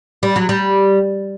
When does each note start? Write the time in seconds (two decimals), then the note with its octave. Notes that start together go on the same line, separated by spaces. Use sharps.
0.23 G3
0.36 F#3
0.49 G3